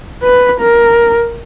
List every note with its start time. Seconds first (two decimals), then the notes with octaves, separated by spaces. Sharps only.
0.23 B4
0.60 A#4